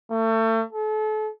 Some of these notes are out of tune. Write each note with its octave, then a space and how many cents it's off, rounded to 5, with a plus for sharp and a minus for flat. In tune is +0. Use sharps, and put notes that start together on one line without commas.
A3 +35
A4 -35